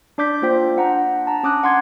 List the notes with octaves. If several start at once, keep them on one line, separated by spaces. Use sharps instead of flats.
D4 D5 D6 G6 B6
A#3 F4 C5 G5 B6
D4 F#5 A#5
A5 A#5
C#4 D6 D#6 F#6
F#5 C6 G#6